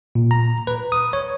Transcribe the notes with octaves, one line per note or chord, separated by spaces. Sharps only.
A#2
A#5
B4
D#6
C#5